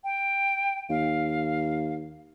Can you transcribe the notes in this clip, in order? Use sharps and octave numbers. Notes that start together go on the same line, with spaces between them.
G5
D#2 F5